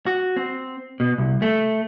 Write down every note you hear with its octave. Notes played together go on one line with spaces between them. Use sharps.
F#4
C4
B2
C2
A3